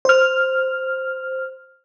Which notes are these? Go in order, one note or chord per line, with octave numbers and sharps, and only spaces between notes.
C5 F6